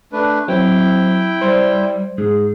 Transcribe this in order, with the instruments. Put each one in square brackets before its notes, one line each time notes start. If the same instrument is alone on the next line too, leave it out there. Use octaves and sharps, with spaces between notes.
[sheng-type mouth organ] A3 D4 B4
[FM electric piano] F#3 C4 [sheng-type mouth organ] E4 G5
[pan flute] G3 [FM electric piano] C5
[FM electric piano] G#2 [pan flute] G#4